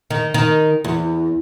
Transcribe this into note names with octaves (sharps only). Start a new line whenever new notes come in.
D#3
D#3
E2